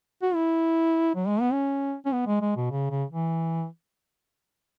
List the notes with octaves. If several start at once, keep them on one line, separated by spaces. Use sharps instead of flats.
F#4
E4
F#3
G#3
B3
C#4
C#4
B3
G#3
G#3
B2
C#3
C#3
E3